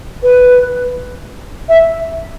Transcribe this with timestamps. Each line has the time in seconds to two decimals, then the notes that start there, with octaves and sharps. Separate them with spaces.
0.23 B4
1.69 E5